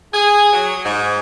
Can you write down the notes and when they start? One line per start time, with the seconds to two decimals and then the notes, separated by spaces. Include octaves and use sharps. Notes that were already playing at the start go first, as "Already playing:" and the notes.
0.14 G#4
0.53 F#3
0.84 G#2